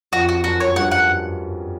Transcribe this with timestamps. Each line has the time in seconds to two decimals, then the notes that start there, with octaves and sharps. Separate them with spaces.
0.12 F2 F3 F#4
0.29 F#4
0.44 F#2 F#3 F#4
0.60 C#5
0.76 G2 G3 F#5
0.91 F#5